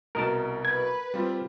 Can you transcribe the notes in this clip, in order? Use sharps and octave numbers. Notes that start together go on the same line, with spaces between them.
C2 B2 A#4 D#5 A5
B4 G#6
G3 C4 F4